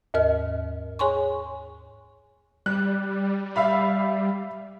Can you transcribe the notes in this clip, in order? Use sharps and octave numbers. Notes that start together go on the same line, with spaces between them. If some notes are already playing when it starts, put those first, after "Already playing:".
D#2 G#2 A#4 D#5 F6
G#4 C#5 G#5 C6 C#6
G3 F#6
E5 F5 B5